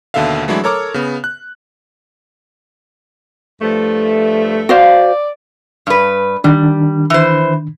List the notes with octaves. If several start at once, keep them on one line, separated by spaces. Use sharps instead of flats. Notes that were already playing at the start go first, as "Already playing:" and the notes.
D#2 B2 D3 A4 E5 F5
E3 F#3 G#3 A3 D4 E4
A4 A#4 C#5 A#5 D6 F6
C#3 B3
F#6
G2 F3 A3
F#4 C5 D5 F5
G2 B4
D#3 G3 D4
E3 C5